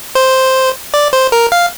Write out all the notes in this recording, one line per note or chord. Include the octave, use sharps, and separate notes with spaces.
C5
D5
C5
A#4
F5